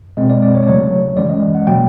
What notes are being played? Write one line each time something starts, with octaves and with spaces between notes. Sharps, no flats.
B2 G#3 C4 D#5
D5
D5
C#5
D5
C#3 F#3 A3 C#5
E3 G#3 C#4 D5
D#5
F#5
B2 F#3 A#3 G5